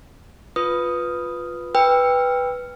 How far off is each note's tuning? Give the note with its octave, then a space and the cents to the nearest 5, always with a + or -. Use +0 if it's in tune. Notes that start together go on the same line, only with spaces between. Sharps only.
F4 +10 B4 +0 D#6 +0
B4 +0 G5 +20 E6 +0